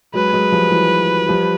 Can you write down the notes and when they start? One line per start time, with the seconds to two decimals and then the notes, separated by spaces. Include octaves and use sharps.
0.14 F#3 G#3 B4
0.33 F#3 G#3
0.52 F3 G3
0.71 E3 F#3
1.29 F3 G3